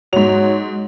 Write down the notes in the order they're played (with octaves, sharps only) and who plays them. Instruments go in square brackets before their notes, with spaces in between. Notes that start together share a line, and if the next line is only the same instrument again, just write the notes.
[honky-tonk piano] G#2 F7 [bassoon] F#3